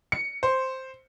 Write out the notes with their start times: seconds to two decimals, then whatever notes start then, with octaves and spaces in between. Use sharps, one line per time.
0.12 C#7
0.43 C5